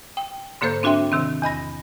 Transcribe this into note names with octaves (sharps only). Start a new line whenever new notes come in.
G5
G#2 D3 A#3 A4 C5 G6
C4 D4 F#4 E5 G5 C6
C3 D#3 C4
E2 D#5 B5 A#6